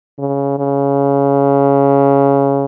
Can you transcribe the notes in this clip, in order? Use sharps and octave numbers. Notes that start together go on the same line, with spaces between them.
C#3
C#3